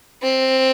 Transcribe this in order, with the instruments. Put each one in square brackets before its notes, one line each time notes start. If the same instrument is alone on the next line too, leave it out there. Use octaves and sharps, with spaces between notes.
[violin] C4